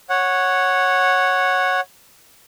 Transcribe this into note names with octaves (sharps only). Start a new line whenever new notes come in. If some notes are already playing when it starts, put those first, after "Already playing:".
C#5 F#5